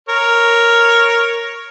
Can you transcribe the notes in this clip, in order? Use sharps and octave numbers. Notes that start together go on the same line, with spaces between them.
A#4 C#5